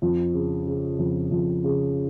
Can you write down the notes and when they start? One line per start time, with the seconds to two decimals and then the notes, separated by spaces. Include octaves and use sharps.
0.02 F2
0.34 C#3
0.66 C#3
0.99 F2
1.31 F2
1.64 C#3